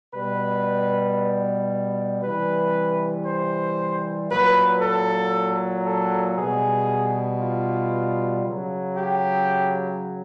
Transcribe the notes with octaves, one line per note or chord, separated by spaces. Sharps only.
B2 G3 B4
C3 E3 G3 B4
C5
A#2 F#3 B4
A4
A4
B2 G3 G#4
F4
C#3 F#3
G4